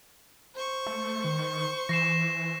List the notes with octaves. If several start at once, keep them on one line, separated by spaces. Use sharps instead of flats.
C5 C#6
A3
D#3
E3 A#6 C7 E7